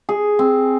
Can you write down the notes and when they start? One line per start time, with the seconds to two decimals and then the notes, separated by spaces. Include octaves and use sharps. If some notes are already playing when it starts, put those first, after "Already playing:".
0.09 G#4
0.39 C4